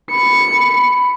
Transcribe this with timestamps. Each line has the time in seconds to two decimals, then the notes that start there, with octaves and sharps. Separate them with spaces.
0.11 B5 C#7